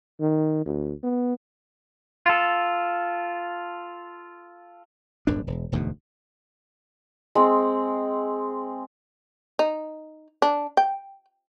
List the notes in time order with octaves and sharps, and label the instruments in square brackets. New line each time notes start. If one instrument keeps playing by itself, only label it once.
[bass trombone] D#3
D2
B3
[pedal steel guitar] F4 A4
[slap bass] D1 G1 F#2 D4
E1
E1 D2 G#2 B2
[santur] G#3 C4
[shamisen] D#4
D4
G5